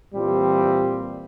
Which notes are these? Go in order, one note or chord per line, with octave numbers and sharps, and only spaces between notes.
A#2 E3 G3 C4 F4